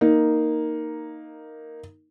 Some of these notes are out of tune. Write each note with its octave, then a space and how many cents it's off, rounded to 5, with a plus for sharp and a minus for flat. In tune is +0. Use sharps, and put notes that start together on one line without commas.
A#3 +0 D#4 +0